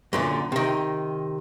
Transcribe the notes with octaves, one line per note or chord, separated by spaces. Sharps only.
F#2 A#2 D3
C3 D#3